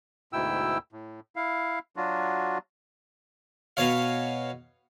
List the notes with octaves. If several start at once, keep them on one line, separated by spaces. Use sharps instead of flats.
D2 G#2 B2 E4 G5 E6
A2
E4 F5
F#3 D4 F4 F#4
B2 C#5 F5